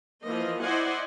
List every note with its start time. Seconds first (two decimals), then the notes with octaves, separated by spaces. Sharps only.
0.22 E3 F3 A#3 D#5
0.62 E4 C5 D5 D#5 F#5 G#5